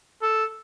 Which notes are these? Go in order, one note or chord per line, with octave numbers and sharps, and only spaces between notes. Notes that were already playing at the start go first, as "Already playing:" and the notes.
A4